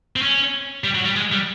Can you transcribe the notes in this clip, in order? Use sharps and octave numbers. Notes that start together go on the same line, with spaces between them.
C4
C#4
G3
F#3
G3
G#3
G3